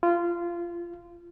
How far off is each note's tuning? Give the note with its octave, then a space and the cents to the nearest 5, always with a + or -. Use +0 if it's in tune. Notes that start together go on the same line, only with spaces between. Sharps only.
F4 -20